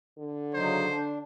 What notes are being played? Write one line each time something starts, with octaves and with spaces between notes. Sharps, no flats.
D3
C#3 F#3 D#4 C5
D4